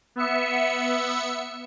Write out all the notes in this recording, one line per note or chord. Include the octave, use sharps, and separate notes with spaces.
B3 E5 C#7